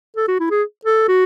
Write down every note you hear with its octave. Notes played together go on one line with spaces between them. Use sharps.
A4
F#4
E4
G#4
A4
F#4